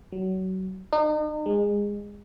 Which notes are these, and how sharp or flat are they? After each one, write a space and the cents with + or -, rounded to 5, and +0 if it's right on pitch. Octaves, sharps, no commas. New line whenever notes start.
F#3 +25
D#4 -40
G#3 -20